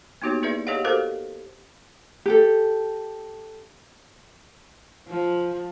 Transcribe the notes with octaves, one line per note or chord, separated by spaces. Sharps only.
A#3 B3 D#4 F#4 G4 C#5
A#3 E4 G#4 B4 D5 E5
G4 G#4 C#5 D#5 F5 F#5
F#4 G4 A4 A#4 C5 F5
G4 A4
F3